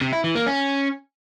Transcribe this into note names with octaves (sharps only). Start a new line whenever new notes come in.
C3
E4
E3
A#3
C#4